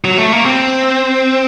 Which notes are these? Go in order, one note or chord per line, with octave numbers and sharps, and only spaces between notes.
F#3
A3
A#3
C4